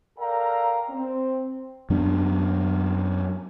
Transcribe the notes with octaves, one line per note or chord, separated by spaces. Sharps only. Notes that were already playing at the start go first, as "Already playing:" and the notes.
A4 A#4 D5 F5 G5 A#5
C4
F#2 F#3 B3 D4